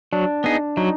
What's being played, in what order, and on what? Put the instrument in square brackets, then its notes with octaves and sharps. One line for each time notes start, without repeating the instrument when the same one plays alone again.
[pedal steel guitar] F#3 [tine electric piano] D4
[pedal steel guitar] B3 D#4 G#4
[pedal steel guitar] F#3 [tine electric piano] D#4